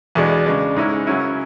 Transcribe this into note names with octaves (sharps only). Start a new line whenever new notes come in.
E2 B2 G#3 D4
C#3 G#3 D4
G#2 G#3 C#4 E4
F#2 C#3 F#3 C#4 E4